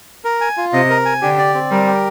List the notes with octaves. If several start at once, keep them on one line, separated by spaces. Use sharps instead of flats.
A#4
G#5
F4
C3 D#5
A#4
G#5
D3 G4
D5
C4
G3 A#4
G4